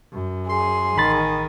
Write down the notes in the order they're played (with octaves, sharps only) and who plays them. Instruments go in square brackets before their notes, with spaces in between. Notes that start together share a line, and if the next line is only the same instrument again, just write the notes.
[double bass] F#2
[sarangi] G#4 [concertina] C6
[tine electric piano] A1 B5 A6 [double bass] D#3